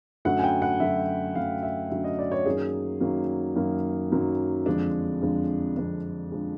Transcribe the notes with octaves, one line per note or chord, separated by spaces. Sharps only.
F#2 D3 F#3 A3 F#5
G#5
G5
F#5
F#2 D3 F#3 A3 E5
F#2 D3 F#3 A3 F5
E5
F#2 D3 F#3 A3 E5
D#5
D5
C#5
F#2 D#3 F#3 A#3 G#4
F#2 D#3 F#3 A#3
F#2 D#3 F#3 A#3
F#2 D#3 F#3 A#3
F2 D3 F3 G#3 D4
F2 D3 F3 G#3
F2 D3 F3 G#3 D4
D3 F3 G#3